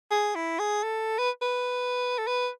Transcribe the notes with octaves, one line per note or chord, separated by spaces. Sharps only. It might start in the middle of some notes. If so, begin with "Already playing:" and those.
G#4
E4
G#4
A4
B4
B4
A4
B4